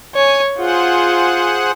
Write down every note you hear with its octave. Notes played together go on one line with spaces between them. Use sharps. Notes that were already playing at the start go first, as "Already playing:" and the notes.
C#5 G#5
F4 G#4 C5 F#5